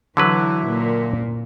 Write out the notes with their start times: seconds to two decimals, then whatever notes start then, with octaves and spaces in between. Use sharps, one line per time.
0.17 D3 E3 F#3 E4 B4
0.70 A#2